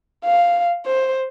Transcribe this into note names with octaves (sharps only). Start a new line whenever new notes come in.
F5
C5